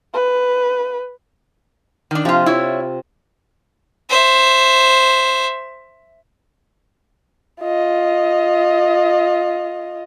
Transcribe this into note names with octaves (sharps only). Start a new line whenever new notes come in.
B4
D#3 D4
C3 F3 F4
E4 F4 C#5
C5 E5
F4 D#5